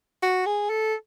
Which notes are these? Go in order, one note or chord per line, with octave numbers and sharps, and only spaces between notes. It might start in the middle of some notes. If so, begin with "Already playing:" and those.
F#4
G#4
A4